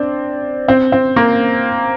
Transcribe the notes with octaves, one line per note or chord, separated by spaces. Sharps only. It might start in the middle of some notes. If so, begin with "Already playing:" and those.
Already playing: C4 D4
C4
C4
A#3